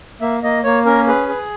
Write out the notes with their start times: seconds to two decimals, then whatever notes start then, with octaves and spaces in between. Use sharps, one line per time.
0.21 A#3 E5
0.43 A#3 D#5
0.64 A#3 C#5
0.85 C#4 A#4
1.07 G#4 B4
1.29 G#4